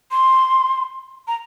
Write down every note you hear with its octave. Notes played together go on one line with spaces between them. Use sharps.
C6
A#5